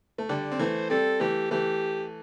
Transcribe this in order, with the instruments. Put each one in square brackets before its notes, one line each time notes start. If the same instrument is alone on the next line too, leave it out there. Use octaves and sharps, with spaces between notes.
[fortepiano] A3
[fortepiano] D3 G3 [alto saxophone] D5
[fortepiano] C4
[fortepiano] E3 A3 [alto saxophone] C5
[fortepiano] G3 C4 [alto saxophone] A4
[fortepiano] E3 A3 [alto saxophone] G4
[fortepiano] E3 A3 [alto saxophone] G4